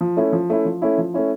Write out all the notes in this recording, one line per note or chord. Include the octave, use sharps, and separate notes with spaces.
F3
A3 C#4 E4
F3
A3 C#4 E4
F3
A3 C#4 E4
F3
A3 C#4 E4